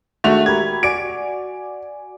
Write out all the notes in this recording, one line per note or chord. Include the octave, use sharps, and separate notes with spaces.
D#3 G#3 A3 D4 F#4 F7
G4 A#4 B5 G#6
F#4 D5 G#5 D7